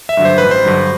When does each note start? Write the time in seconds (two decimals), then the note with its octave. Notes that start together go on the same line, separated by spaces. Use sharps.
0.09 E5
0.17 G2 D3 F#3
0.25 C5
0.38 A1 B4
0.51 C5
0.65 G2 D3 F#3